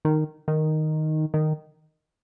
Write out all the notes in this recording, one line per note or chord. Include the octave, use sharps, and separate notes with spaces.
D#3
D#3
D#3